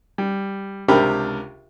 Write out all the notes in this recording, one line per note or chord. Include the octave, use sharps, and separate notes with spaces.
G3
C#2 C3 D4 G4 A#4 B5